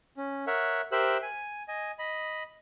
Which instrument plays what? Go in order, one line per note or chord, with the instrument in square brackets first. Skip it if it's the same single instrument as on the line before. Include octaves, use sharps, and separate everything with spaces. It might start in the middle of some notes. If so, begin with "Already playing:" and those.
[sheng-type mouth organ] C#4
A#4 C#5 E5 F#5
G4 A#4 C5 E5 E6 F#6
G#5
D#5 G#5
D#5 B5